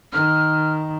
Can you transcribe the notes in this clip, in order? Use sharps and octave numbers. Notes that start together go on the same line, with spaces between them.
D#3 F6